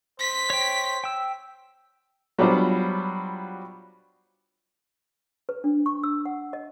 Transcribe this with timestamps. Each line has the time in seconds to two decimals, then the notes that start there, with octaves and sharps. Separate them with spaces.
0.20 C5 B6
0.50 C#5 G5
1.04 G5 E6
2.39 F#3 G3 B3 D4 F4 C5
5.49 B4
5.64 D4
5.86 C#6
6.04 E6
6.26 F#5
6.53 D#5